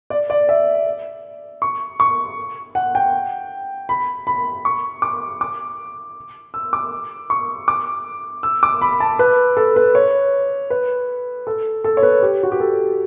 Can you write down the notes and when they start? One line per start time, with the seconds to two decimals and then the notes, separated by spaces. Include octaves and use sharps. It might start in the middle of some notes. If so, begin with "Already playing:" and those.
0.10 D5
0.30 D5
0.49 E5
1.62 C#6
2.00 C#6
2.75 F#5
2.95 G5
3.89 B5
4.27 B5
4.65 C#6
5.02 D6
5.41 D6
6.54 E6
6.73 D6
7.30 C#6
7.68 D6
8.43 E6
8.63 D6
8.81 B5
9.00 A5
9.19 B4
9.57 A4
9.76 B4
9.95 C#5
10.70 B4
11.47 A4
11.84 A4
11.97 C#5
12.03 B4
12.23 G4
12.43 F#4
12.52 G4
12.60 A4